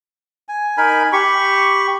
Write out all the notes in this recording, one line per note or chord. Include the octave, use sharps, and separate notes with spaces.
G#5
D#4 A#4 G#5 B5
G4 B5 C#6